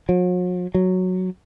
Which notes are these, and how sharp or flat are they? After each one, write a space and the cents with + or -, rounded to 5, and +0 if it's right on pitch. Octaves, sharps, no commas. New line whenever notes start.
F#3 -45
F#3 -5